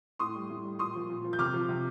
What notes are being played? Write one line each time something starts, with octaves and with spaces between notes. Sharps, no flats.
A2 C6 D#6
G3
A2
G3
A#2 C6 D#6
F3
A#2
F3
G6
C3 D6 F6
F3
C3